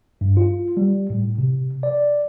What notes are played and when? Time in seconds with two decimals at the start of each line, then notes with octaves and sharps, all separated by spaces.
0.21 G2
0.37 F4
0.77 G3
1.10 A2
1.38 C3
1.83 D5